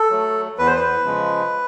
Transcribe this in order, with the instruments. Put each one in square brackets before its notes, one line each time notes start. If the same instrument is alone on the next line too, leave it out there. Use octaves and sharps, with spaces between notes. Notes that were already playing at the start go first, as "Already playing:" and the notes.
Already playing: [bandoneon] A4
F#3 A3
E2 B4
C5
B4
C#3 F3 G#3